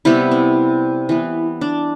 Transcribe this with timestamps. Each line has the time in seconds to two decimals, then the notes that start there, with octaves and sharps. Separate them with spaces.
0.05 C3 G3 B3 E4
0.31 C4
1.09 E3 B3
1.61 D4